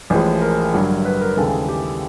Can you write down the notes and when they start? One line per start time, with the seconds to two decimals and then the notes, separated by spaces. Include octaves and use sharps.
0.10 A1 A2 F3 G#3
0.41 A#4
0.73 G2 D3 F#3
1.05 B4
1.21 A#4
1.37 D#2 C#3 E3 G#3 A4
1.53 G#4
1.69 G4